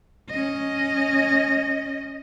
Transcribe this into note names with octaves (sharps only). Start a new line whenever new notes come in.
C#4 D#5